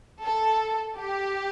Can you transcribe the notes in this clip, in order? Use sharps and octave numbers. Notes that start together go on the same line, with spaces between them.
A4
G4